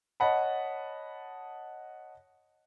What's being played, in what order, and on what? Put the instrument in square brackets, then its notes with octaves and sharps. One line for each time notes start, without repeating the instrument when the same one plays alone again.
[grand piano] C#5 D#5 F#5 A5 B5